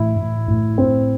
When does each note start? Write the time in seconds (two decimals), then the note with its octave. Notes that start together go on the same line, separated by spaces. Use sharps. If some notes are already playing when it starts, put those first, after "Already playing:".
Already playing: A2 E3 E4
0.16 A2
0.48 A2
0.78 A2 C4